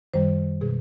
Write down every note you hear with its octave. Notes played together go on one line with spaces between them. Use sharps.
F#2 D#3 G3 C5
B2 G#3 G#4